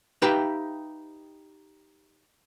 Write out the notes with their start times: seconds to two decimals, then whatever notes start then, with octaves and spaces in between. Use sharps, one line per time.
0.22 D#4 G4 B4 E5 F5 G5